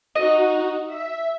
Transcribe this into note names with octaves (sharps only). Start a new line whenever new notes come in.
D#4 F#4 D#5
E5